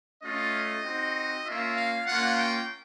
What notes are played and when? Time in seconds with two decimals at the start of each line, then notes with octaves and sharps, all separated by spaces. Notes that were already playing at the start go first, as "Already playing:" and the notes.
0.22 A3 C#4 F4 D#5
0.83 C4 D#4 F#4
1.45 A#3 C#4 F4 E5
1.76 F5
2.06 A#3 C#4 F4 F#5
2.37 G5